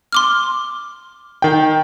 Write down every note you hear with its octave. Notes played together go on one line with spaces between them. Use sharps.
C6 D6 F6
D#3 G5